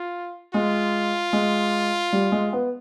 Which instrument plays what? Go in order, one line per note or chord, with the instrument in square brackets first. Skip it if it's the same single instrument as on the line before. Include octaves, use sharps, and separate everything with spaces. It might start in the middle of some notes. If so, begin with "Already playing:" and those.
Already playing: [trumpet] F4
[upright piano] G#3 [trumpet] F4
[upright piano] G#3
G3
G#3
B3